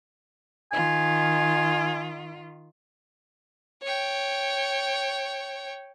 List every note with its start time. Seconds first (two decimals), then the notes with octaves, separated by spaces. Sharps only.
0.72 D#3 F4 G#5
3.82 C#5 G5